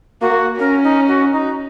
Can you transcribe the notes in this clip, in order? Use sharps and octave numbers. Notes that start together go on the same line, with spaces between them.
A#3 F#4
C#4 A#4
D#4
F#4
D#4